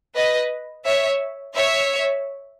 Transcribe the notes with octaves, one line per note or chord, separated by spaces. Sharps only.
B4 D#5
C#5 E5
C#5 E5